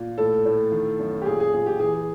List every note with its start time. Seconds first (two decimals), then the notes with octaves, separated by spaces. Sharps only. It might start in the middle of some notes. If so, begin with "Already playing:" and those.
Already playing: A#2
0.18 A2 A4
0.45 A2
0.72 D#3
0.99 F#2
1.22 G4
1.26 A#2 G#4
1.40 G#4
1.53 A#2 G#4
1.66 G4
1.80 E3 G#4